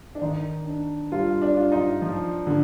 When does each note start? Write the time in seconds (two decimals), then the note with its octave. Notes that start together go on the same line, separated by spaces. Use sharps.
0.15 D4
0.21 D#3 D#4
0.66 D4
1.12 G3 F4
1.42 D4
1.57 F4
1.72 D#4
2.02 F3
2.47 D3